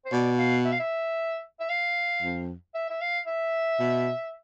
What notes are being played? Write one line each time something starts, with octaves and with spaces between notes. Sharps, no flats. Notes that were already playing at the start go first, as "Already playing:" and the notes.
C5
B2 D5
F5
E5
F5
E5
E5
F5
F2
E5
E5
F5
E5
B2